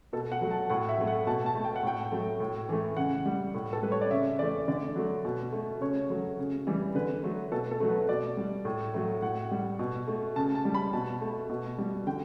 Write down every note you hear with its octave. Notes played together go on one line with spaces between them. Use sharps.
B2 A4
F#5
F#3 A3
A5
A2 F#5
E5
F#3 A3
F#5
B2 A5
A5
A3
G5
F#5
A2 G5
F#3 A3
A2
E3 A3
C#3 F#5
G3
A2
A4
G3 B4
C#5
D5
C#3 E5
E3 A3 D5
D3 D5
F#3 A3
B2
A3
C#3 C#5
F#3 A3
C#3
E3 G3
D3 B4
F#3 A3
B2 A4
A4
F#3 A3
B4
B2 D5
G3
A2
F#3 A3
A2 F#5
G3
B2
A3
C#3 A5
A5
G3
B5
B2 A5
A3
B2
G3
D3 G5